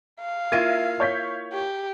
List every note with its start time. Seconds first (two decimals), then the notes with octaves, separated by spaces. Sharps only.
0.20 F5
0.52 A#3 E4 F4 G#6 A#6 D#7
1.00 C#5 G6 B6
1.53 G4